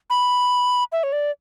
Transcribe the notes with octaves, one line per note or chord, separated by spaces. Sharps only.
B5
E5
C#5
D5